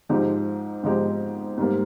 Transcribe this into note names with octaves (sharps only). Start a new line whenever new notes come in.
G#2 F3 G#3 D#4 G4
G#2 F3 G#3 D#4 G4
G#2 G3 A#3